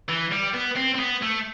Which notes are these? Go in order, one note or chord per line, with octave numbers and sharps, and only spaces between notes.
E3
G3
B3
C4
C4
B3
A3